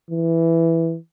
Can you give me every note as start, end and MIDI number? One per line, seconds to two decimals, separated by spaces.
0.10 0.97 52